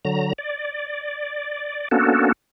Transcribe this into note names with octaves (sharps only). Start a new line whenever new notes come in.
D3 F#3 A#5
D5
A#3 B3 C#4 D4 F#4 A4